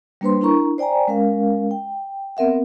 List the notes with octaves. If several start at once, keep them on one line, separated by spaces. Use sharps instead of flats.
G3 A#3 D4 B4 C5 C6
D4 E4 A#4 A#5 C#6
C5 D5 G5 G#5 A#5
G#3 C#4 A#4 F5
G5
B3 C4 A#4 E5 F#5